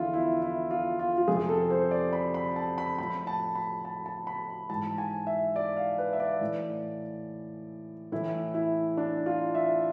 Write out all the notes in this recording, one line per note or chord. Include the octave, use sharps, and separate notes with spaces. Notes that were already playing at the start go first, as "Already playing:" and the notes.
Already playing: E2 D3 F3 E4 F4
E4
E4
F4
F4
F4
F2 C3 F3 G#4
A4
C5
D5
B5
B5
A5
B5
A2 F3 B5
A5
B5
A5
A5
B5
G#2 E3 A5
G#5
E5
D5
F5
B4
E5
D5
A2 E3
A2 E3 E4
E4
D4
F4
E5